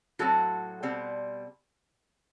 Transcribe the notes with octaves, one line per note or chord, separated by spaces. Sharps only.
A2 F#3 C4 F#4 A4
B2 G3 C4